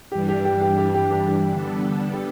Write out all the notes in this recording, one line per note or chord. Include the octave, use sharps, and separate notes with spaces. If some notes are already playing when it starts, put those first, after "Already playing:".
G2 E3 G3 D4 G4
G4
G4
G4
G4
G4
G4
G4
D3 G3 B3 D4 A4
G4